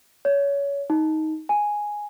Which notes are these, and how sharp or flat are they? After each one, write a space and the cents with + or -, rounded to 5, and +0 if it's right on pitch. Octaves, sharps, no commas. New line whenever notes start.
C#5 +25
D#4 +15
G#5 +0